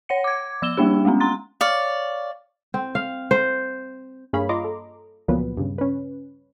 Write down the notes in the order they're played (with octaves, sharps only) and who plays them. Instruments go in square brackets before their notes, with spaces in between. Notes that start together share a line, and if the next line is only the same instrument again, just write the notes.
[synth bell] C#5 F#5 C#7
D6 G#6
F3 E6 E7 G7
G3 A#3 D4 G4
G#3 A3 B3 C#4
A#5 C6 A6
[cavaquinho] C#5 D5 F5
[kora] C4
F5
C5
[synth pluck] G2 A#3 G#4 C#5 F5 B5
F4 D#5 A#5 C6 D6
A4
C#2 A#2 F3 F#3 B3 B4
G2 C#3
C#4 B4